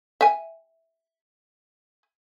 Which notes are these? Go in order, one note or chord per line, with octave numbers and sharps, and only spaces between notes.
E5 G#5